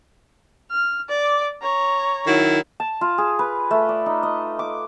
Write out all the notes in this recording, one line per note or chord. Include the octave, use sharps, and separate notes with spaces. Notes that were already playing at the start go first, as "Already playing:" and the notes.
F6
D5 D6
C#5 A#5
D#3 F#3 E4
A5
F4
G#4
B4
A3
D5
D#4
D#5
D6